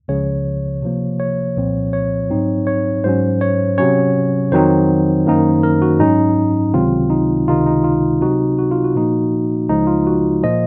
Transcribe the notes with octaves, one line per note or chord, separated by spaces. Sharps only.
C#2 C#3 F3 C#5
C3 F3 A#3
C#5
C2 A#2 F3 C4
C#5
G#2 F#3 C4 D#4
C#5
G#2 F#3 C#4 C5
C#5
C3 F#3 C#4 C#5
F2 D#3 F#3 C4 D#4 C5
F#2 D#3 A#3 D#4
A#4
F#4
G#2 F#3 C#4 D#4
C#2 C3 D#3 F#3 C4 F4
D#4
C#2 C3 D#3 G#3 D#4 F4
D#4
F4
C3 F#3 C4 D#4 F#4
F#4
F4
F#4
A#2 F3 A#3 D#4
C#2 C#3 F3 G#3 D#4
F4
F#4
A#2 F3 A#3 D#5